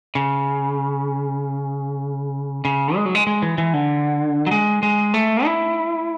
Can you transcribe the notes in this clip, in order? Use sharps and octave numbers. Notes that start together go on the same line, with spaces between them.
C#3
C#3
G#3
F#3
G#3
G#3
E3
E3
D3
F#3
G#3
G#3
A3
E4